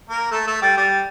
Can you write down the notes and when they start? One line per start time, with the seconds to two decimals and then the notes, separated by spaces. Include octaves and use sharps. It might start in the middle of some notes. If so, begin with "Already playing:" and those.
0.09 A#3 A#4
0.31 A3 A4
0.47 A3 A4
0.62 G3 G4
0.77 G3 G4